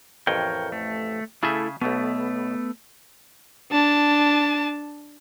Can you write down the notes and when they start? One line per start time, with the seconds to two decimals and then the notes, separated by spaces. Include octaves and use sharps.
0.27 A1 F2 A#4 C#5 G5
0.72 A3
1.43 C#3 A3 E4 G#4 A4 E5
1.81 B1 B2 A3 B3
3.72 D4 A5